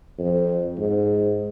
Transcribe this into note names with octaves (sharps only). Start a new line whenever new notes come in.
F2
G#2